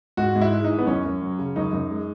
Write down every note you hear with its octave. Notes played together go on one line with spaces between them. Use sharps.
G#2 F#4
G#2
E4
G#3
E3 D#4
B3
F#2 C#4
F#2
F#3
C#3
F#2 D#4
F#2
G#3